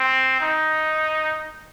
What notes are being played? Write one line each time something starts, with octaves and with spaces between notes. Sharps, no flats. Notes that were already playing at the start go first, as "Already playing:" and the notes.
Already playing: C4
D#4